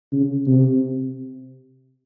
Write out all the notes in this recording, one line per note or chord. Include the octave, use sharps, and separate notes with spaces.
C#3
C3